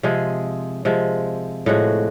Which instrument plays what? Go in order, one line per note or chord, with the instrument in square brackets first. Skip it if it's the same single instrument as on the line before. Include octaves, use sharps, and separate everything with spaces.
[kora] C3 F3 G#3 G#4
C3 F3 G#3
A2 F3 G#3 F#4